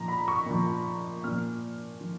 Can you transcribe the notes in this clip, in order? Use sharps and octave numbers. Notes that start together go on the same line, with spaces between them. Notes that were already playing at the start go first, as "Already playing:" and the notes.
Already playing: A#2 F3 A#5
B5
C#6
A#2 F3
A#2 F3 F6
F3